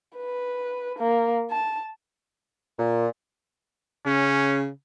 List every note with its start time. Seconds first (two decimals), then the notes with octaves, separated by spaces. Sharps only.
0.17 B4
0.99 A#3
1.51 A5
2.78 A#2
4.06 C#3 C#4